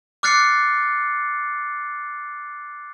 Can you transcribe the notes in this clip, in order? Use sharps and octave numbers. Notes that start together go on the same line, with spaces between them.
D6 F6 F#6 A6 C7 C#7